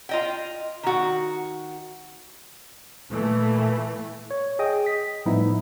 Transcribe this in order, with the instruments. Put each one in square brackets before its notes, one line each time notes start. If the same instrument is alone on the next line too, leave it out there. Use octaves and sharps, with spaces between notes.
[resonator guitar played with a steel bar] F4 D#5 G5
D#3 F#4
[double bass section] A#2 E3 A3
[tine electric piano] C#5
G#4 D#5 G5 D#6
B6
A2 F3 G3 B3 D#4 E4